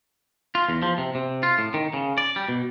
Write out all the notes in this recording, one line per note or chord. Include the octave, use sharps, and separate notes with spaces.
F4
E2
F3
C3
C3
F4
A2
D#3
C#3
D5
G3
B2